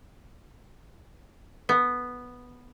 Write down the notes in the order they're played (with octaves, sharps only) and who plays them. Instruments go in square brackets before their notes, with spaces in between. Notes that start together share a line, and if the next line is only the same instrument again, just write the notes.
[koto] B3